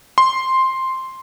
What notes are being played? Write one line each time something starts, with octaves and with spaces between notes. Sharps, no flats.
C6